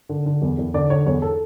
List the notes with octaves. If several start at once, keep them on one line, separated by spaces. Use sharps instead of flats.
D3
D3
E2
E2
D3 D5
D3 C#5
E2 C#5
A4